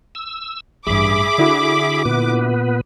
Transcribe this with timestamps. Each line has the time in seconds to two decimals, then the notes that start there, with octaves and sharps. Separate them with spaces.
0.15 E6
0.87 A1 G2 G#4 E5 B5 D6
1.38 D3 E4 F#4
2.05 A#2 B3 B4